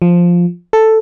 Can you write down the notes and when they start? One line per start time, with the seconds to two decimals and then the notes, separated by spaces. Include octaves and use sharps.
0.02 F3
0.73 A4